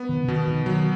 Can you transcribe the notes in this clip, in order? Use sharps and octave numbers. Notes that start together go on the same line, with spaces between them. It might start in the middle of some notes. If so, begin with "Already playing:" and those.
Already playing: B3
D#3
C#3
B2 D#3
D#3
D#3 F#3